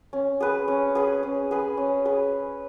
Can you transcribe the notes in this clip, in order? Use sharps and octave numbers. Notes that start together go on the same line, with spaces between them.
C#4
G#4 B4
C#4
G#4 B4
C#4
G#4 B4
C#4
G#4 B4